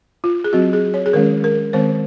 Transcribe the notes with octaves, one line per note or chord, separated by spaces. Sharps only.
F4
G#4
F#3 C4 F#4
G#4
C#5
G#4
D#3 G#3 C#4 A#4
A#4
D#3 G#3 C4 C5